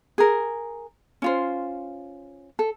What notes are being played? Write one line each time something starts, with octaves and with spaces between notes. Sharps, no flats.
G#4 A#4
C#4 F4 C5
A4